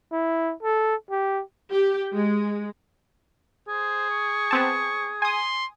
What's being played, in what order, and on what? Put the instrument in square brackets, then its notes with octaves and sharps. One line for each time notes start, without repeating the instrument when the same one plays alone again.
[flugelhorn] E4
A4
G4
[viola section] G4
G#3
[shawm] G#4 [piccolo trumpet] C5
[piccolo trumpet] C#6
[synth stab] B3 C4 A5
[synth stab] G#5 D#6 [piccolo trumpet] C6